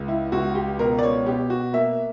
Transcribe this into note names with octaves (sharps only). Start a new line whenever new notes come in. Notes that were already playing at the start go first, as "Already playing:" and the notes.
Already playing: C#2
E4
C#2 F#4
G4
B2 A#4
D5
C#5
B2 G4
F#4
A#3 E5